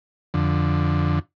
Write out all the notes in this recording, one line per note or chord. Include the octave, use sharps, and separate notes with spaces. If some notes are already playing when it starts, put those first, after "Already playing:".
F2 D3